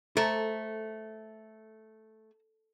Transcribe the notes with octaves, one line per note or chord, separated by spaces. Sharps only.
A3 A4 C5 A#5